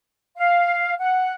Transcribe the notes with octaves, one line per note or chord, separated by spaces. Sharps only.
F5
F#5